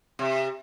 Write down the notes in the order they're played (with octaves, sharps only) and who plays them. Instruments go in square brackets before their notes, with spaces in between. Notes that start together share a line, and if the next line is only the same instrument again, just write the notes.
[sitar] C3